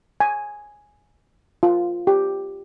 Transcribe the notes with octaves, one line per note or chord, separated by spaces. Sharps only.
G#5
F4
G4